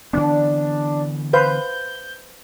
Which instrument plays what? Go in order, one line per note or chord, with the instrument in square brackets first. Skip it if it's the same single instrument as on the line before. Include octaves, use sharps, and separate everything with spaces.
[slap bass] D3 E3 B3 [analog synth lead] D4
[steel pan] B4 C5 F5 [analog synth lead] G6